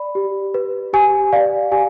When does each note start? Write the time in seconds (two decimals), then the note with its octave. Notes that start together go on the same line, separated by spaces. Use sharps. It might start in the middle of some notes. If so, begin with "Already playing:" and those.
Already playing: D5 B5
0.15 G4
0.54 B4
0.93 G4 G#5
1.33 D5 F5
1.71 G4 G#5